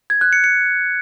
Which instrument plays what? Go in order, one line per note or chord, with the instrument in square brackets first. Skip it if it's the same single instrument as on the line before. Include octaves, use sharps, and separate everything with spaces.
[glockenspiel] G#6
F#6
C#7
C#7